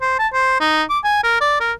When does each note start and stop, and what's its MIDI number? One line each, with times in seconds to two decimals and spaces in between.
0.01 0.18 72
0.19 0.28 81
0.33 0.57 72
0.60 0.83 63
0.89 0.99 86
1.04 1.21 80
1.24 1.37 70
1.41 1.58 74
1.60 1.72 70